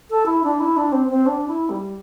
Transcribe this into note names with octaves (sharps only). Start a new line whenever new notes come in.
A4
E4
D4
E4
D4
C4
C4
D4
E4
G3